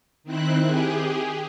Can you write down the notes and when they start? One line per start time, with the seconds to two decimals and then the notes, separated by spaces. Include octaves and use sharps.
0.24 D#3 C4 E4 F#6
0.66 G4 G#4